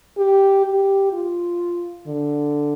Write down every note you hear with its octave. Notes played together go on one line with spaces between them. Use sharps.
G4
G4
F4
D3